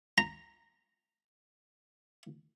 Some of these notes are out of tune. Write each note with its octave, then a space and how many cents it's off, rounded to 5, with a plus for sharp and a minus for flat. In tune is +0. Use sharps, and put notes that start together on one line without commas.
A#5 -10